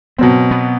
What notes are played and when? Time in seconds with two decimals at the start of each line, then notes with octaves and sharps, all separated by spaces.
0.18 B2 F#3 B3 C4
0.51 B3